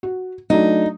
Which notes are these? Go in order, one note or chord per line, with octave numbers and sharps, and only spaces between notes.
F#4
F#3 A3 D4 D#4